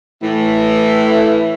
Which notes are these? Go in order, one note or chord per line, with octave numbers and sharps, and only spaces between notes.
A2 E3